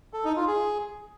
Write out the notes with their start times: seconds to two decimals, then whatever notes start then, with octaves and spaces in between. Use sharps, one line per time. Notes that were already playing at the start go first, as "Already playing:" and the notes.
0.13 A4
0.25 D#4
0.36 F4
0.48 G#4